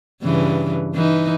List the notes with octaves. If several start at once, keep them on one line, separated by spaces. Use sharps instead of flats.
G2 C#3 E3
E3 D#4